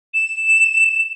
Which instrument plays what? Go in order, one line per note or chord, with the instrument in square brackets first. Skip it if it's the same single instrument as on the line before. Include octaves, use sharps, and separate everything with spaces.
[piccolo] E7